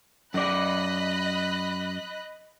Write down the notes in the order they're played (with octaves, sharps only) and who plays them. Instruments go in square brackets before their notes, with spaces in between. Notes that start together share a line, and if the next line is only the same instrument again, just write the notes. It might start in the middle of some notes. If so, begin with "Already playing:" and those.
[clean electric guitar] F#2 D5 [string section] D#5 B5 F#6